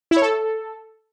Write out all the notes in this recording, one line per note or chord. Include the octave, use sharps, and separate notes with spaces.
E4
C#5
A4